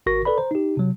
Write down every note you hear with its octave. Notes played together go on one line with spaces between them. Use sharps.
G#1 F#4 A#4 C#6 A#6
A4 B4 D5 B5
C5 A#5
D#4 G4
C3 F#3